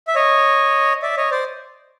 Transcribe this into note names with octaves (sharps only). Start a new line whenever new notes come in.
E5
C#5 D#5
D5 E5
C#5 D#5
C5 D5